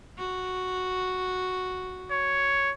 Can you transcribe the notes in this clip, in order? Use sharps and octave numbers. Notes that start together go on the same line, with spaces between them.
F#4
C#5